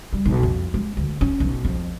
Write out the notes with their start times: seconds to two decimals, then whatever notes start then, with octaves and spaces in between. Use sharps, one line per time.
0.13 G3
0.25 B1
0.43 F2
0.74 G#3
0.97 D2
1.21 C#4
1.40 B1
1.65 F2